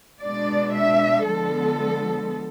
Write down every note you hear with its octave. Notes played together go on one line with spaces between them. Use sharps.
B2 G#3 D4 D5
E5
D3 F3 G#3 B3 A4